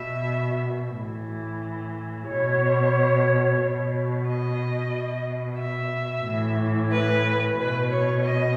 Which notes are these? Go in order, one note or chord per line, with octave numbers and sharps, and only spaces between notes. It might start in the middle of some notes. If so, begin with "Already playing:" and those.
Already playing: B2 E5
A2 E3
B2 C#5
B2
D#5
B2
E5
A2 E3
B4
B2 B4
C#5
D#5